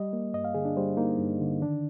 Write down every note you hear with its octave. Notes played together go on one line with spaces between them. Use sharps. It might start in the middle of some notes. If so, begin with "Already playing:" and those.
Already playing: G3 D#5
A#3
G2 D#5
F5
D3 G#4
D4
G3 C5
A#3 D#4
G2
D3
D#3 D4